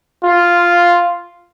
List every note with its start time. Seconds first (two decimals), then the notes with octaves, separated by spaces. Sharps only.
0.24 F4